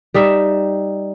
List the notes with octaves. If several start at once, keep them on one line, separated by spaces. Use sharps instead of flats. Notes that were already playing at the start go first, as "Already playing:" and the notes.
G3 D#4 E5